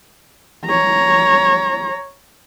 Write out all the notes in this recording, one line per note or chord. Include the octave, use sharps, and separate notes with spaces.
C#5 A#5